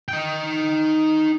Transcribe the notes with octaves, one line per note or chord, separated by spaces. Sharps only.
D#4 G5